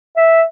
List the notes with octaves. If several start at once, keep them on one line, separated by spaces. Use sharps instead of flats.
E5